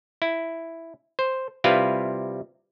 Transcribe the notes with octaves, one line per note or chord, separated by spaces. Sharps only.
E4
C5
C3 G3 E4 F4 B4 F5